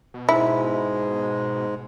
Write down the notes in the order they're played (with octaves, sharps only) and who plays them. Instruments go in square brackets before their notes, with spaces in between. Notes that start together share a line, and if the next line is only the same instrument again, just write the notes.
[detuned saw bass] B2
[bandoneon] G#2 G#3 [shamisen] E4